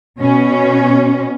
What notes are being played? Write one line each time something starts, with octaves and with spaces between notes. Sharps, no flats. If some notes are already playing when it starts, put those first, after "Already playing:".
B2 C#4